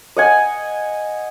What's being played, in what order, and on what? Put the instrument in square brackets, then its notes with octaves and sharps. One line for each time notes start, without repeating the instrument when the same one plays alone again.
[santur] D#5 F#5 G#5